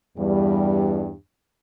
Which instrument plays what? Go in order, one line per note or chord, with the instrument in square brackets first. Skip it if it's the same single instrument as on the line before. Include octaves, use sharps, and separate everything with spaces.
[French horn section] E2 G2 G3